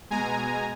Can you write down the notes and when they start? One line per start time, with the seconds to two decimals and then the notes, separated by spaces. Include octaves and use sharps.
0.10 B2 G#3 G#5 A#5